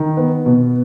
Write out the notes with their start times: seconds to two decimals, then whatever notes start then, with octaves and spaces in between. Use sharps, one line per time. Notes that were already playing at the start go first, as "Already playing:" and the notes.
Already playing: D#3
0.17 B3
0.46 B2